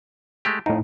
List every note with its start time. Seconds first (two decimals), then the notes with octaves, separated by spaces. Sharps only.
0.45 G#3 A3 G4
0.66 F2 A2 D#4